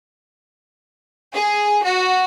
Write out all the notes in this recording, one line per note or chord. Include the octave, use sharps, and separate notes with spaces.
G#4
F#4